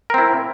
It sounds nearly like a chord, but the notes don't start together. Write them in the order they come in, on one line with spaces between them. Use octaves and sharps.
A#4 C4 E4